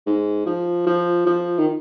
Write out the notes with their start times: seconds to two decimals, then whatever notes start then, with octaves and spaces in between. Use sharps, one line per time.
0.06 G#2
0.46 F3
0.86 F3
1.26 F3
1.59 D#3